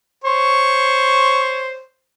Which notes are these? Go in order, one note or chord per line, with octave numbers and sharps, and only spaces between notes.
C5 C#5